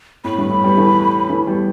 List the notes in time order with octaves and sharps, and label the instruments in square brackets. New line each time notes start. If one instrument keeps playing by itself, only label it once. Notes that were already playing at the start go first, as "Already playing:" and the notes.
[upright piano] A2 [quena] B5
[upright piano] G2
A2
G3 B3
E3 A3
E3 A3
G3 B3